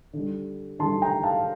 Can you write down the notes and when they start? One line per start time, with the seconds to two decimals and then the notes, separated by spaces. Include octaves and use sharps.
0.13 D3
0.19 G3
0.79 D3 G3 A5 C6
1.02 G5 A#5
1.23 F5 A5